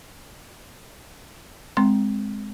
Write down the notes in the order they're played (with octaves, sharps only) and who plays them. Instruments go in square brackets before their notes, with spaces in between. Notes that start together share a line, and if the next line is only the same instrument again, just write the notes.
[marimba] G#3 C4 C6